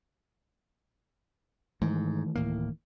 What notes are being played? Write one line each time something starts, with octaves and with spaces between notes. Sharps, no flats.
G#2 D#3 E3 A3
D1 A2 A#3